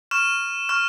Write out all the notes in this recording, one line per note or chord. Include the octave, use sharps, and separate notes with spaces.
C#6 F6 E7
C#6 F6